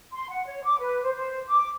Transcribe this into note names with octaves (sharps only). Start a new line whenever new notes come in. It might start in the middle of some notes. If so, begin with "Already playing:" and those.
C6
F#5
C#5
D6
B4
C5
C5
D6